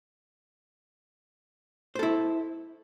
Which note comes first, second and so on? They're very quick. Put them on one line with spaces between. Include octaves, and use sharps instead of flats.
C5 A4 E4